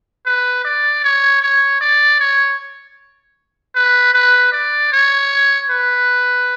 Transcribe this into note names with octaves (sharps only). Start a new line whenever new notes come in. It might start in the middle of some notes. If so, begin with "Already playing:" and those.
B4
D5
C#5
C#5
D5
C#5
B4
B4
D5
C#5
B4